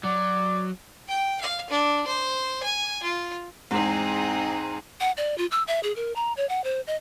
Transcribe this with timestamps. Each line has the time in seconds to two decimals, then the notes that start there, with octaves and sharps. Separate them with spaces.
0.05 F#3 D5
1.08 G5
1.41 F5
1.70 D4
2.07 C5
2.63 G#5
3.03 F4
3.71 E2 G#2 C4 D#4 G#4
5.00 F#5
5.17 D5
5.38 F4
5.51 E6
5.68 E5
5.83 G#4
5.96 A#4
6.16 A#5
6.37 C#5
6.49 F#5
6.64 C5
6.87 D#5